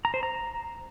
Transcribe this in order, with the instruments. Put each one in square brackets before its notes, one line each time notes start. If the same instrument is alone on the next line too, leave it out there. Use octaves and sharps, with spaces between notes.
[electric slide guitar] A#5
C5
A#5